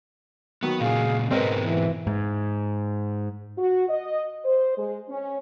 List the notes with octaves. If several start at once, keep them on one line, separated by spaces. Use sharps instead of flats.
D#3 F#3 B3
A#2 C#3 G#4 F5
G#2 B2 G#3 C4 A#4 B4 D#5
E3
G#2
F#4
D#5
C5
G#3
C#4